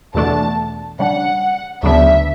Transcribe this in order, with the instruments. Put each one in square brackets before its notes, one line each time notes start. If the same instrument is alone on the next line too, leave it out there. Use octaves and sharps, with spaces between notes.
[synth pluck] E2 B2 A3 D4 F#4 [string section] A5
[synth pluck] C#3 G3 D4 [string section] F#5
[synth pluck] D2 C#3 F#3 B3 D4 [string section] E5